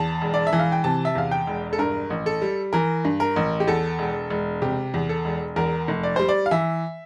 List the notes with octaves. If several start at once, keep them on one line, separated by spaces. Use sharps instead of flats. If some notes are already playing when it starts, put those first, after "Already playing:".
Already playing: E2 A5
E1
D5
E5
E3
F5
G5
C3 A5
E5
E2 F5
G5
E1
A4
G2 A#4
A1
A4
G3
E3 A#4
G2
A#4
A1
G4
E2 A4
E1
E1
C3 G4
E2
A4
E1
E2 A#4
F1
D5
G3 C5
D5
F5
E3 E5